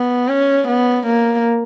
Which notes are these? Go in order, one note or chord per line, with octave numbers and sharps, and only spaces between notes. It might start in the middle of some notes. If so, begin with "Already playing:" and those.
Already playing: B3
C#4
B3
A#3